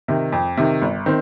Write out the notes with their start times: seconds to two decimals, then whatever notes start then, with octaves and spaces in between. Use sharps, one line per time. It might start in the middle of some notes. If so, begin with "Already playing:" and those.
0.08 C3 D#3
0.32 F2
0.57 C3 D#3
0.81 G1
1.06 D#3 C4